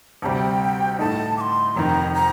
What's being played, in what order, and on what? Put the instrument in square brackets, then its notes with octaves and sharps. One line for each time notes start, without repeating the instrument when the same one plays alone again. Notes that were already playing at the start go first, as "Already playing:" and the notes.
[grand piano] D2 C3 G3 [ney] G5 A5
[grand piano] A2 A3 D#4 [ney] A5
[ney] D6
C6
[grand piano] F1 F2 D#3 [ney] A#5
[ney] A#5